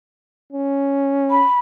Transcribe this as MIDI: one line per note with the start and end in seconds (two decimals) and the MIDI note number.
0.52 1.44 61
1.30 1.59 83